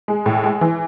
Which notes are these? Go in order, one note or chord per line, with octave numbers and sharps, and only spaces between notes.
G#3
A2
G#3
E3